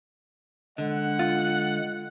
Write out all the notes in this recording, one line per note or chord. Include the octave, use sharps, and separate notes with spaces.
D3 G#3 F#5
F4